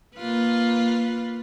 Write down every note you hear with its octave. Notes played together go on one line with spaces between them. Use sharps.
A#3 F4 B4